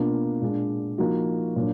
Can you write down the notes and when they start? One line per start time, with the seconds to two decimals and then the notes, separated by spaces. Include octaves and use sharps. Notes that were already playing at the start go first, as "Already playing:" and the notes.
Already playing: B2 A#3 D4 F4
0.41 A#2 G#3 D4
0.98 F3 A#3 D#4 F#4
1.56 A#2 F#3 D4